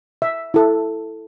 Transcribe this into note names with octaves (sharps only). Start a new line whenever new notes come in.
E5
E4 A4